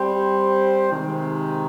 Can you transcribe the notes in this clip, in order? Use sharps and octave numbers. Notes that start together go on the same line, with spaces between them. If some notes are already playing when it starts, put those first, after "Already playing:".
Already playing: G3 C4 G4 C5
C3 D#3 G#3